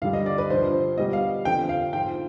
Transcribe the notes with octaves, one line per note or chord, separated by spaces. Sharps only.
G2 D3 G3 F5
D#5
D5
B4
G2 D3 F3 C5
B2 G3 D#5
F5
F2 D3 F3 G5
F5
G#2 F3 G5